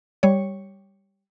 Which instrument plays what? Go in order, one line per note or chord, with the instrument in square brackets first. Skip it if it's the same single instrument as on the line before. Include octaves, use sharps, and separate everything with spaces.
[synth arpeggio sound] G3 C#5